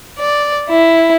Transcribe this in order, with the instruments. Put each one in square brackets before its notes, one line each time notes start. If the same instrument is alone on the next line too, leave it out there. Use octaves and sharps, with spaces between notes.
[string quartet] D5
E4